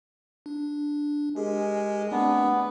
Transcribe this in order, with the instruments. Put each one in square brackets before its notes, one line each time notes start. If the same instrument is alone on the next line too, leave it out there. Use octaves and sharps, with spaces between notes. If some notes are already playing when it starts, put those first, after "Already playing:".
[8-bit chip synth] D4
[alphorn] G#3 [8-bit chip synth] G4 G#4 A#4
[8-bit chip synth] A3 C4 [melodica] B3 [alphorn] D4